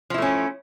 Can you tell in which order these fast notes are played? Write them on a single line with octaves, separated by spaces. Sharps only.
F3 E4 A3 C#4